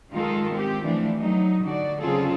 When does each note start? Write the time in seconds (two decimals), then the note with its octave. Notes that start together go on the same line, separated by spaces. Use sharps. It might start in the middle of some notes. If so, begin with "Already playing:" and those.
0.13 D#3 G#3 F4 A4 A#4
0.52 G#3 C4 G4
0.85 E3 F3 A3 D4
1.18 F#3 A3 D#4
1.63 D3 F#4 D5
2.00 C#3 F#3 C4 F4 G#4 A4